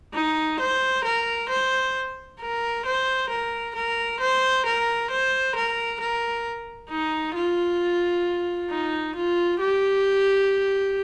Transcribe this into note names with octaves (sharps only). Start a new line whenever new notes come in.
D#4
C5
A#4
C5
A#4
C5
A#4
A#4
C5
A#4
C5
A#4
A#4
D#4
F4
D#4
F4
G4